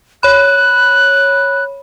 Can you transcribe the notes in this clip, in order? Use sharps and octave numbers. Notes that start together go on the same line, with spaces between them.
C#5 B5 F#6